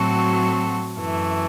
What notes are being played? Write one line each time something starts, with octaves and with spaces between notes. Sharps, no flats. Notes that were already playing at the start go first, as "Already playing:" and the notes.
Already playing: A2 F#3 C4 F#4 A4
F#2 E3 A3